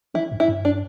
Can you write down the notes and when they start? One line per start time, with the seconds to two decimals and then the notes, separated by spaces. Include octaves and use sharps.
0.14 E3 E4
0.32 G2
0.40 E4
0.48 G2
0.65 D4